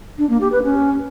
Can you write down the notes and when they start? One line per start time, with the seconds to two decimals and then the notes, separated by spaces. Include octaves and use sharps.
0.18 D4
0.29 A#3
0.41 G4
0.52 B4
0.63 C#4